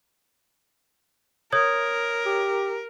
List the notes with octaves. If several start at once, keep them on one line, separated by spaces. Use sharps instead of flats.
A#4 C#5 D#6 G#6
G4